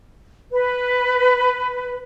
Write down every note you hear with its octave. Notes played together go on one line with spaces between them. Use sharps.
B4